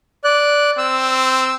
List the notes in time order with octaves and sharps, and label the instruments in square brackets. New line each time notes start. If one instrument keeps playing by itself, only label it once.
[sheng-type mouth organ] D5 F#6
[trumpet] C4 [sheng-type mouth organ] E6